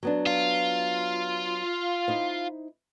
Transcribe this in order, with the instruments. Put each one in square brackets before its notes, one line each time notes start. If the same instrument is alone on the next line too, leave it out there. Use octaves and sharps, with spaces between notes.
[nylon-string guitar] F#3 B3 D4
[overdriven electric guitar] F4
[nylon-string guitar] D#4 E4 C5